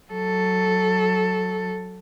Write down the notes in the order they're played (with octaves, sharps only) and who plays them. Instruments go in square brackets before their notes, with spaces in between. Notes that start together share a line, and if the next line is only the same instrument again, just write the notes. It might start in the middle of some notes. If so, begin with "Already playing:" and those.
[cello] F#3 A4